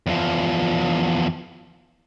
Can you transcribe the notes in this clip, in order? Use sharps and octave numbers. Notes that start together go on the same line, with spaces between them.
E2 F3